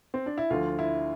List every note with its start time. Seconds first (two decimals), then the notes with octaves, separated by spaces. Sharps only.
0.14 C4
0.26 D4
0.38 E4
0.50 D2 D3 F3 F4
0.79 E4